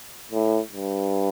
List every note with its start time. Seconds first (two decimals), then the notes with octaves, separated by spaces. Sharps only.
0.32 A2
0.73 G2